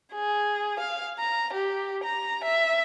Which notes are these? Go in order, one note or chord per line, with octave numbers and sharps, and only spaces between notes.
G#4
F5
A#5
G4
A#5
E5